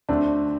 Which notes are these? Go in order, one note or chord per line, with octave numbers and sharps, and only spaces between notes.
D2 D3 A3 C4 D4